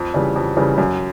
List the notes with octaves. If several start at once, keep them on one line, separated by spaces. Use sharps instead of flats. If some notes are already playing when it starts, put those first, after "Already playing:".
Already playing: F2
C#3 E3 G3
F2
C#3 E3 G3
F#2